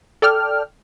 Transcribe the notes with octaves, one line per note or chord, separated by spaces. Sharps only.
A4 D5 G5 F6